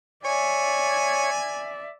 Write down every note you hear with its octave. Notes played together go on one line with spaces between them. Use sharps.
C#5 D5 E5 G#5